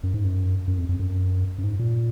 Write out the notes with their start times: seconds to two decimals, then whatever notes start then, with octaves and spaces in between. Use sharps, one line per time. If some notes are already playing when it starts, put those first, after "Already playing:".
0.03 F#2
0.14 G#2
0.25 F#2
0.68 F#2
0.78 F2
0.89 F2
0.99 F#2
1.58 F#2
1.64 G#2
1.79 A#2